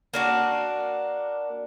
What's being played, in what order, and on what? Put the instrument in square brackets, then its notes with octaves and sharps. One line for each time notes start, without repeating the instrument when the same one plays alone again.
[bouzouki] A#3 D4 F#4